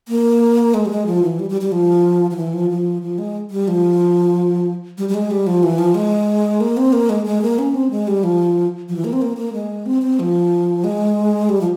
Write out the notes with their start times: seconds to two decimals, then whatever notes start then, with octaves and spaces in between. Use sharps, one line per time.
0.08 A#3
0.74 G#3
0.85 G3
0.91 G#3
1.06 F3
1.23 E3
1.39 G3
1.50 G3
1.61 G3
1.72 F3
2.31 F3
2.36 E3
2.53 F3
2.70 F3
3.02 F3
3.18 G#3
3.51 G3
3.68 F3
4.98 G3
5.09 G3
5.14 G#3
5.31 G3
5.47 F3
5.63 E3
5.78 F3
5.95 G#3
6.61 A#3
6.77 C4
6.93 A#3
7.09 G#3
7.26 G#3
7.42 A#3
7.59 C#4
7.74 C4
7.91 G#3
8.08 G3
8.23 F3
8.89 F3
8.96 E3
9.04 A#3
9.13 C4
9.22 A#3
9.37 A#3
9.53 G#3
9.86 C4
10.02 C4
10.19 F3
10.84 G#3
11.49 G3
11.61 F3